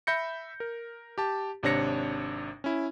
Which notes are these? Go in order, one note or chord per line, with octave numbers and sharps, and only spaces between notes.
E5 B5 G6 A#6 C#7
A#4
G4 A5
G#1 C3 D4 C#5 A#6 C#7
C#4 E4